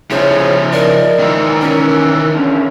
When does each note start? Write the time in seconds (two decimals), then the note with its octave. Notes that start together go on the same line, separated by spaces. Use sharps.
0.11 C#3 F3 E4 G#4 C5 C#5
0.73 A#4 D5 D#5
1.19 G#2 D#3 E3
1.62 C#4 A#4
2.35 D3 C#4 E4